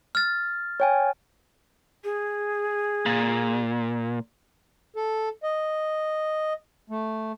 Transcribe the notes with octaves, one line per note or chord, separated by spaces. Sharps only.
F6 A6
C#5 G5 G#5
G#4
A#2
A4
D#5
A3